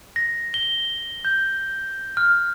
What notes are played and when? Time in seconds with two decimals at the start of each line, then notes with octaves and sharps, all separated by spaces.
0.16 A#6
0.54 G7
1.25 G6
2.17 F6